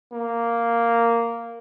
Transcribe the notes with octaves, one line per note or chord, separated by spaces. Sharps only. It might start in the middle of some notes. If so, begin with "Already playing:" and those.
A#3